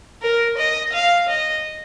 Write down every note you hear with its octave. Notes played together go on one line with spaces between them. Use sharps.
A#4
D#5
F5
D#5